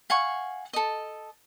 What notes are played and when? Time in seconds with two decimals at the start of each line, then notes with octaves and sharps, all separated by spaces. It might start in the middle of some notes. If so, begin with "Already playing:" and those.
0.10 F5 F#5 G#5 C#6
0.73 A4 D#5